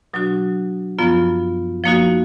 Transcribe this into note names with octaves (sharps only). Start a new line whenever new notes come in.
B2 F#3 D4 F#4
F#2 F3 B3 F4
F3 A#3 D#4 F#4